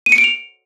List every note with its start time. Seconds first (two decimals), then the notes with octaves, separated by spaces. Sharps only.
0.06 D#7
0.12 C#7
0.18 D7
0.24 F7